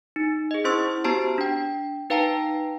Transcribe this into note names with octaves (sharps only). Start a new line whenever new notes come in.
D#4
G#4 D#5
C#4 E4 C5 C6 C#6 E6
B3 F#4 G4 C5 A5 A#5
D4 G5
D#4 B4 F5 G5 A5 A#5